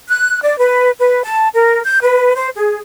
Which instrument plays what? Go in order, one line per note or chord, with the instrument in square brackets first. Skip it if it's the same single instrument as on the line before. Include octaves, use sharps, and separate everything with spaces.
[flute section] F#6
D5
B4
B4
A5
A#4
G6
B4
C5
G#4